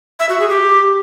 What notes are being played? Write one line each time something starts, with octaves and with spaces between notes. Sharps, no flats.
E5
F#4
G#4
G4